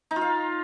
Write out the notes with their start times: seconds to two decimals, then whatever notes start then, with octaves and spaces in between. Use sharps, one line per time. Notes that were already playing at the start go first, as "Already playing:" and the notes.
0.11 D#4
0.16 F4
0.21 F5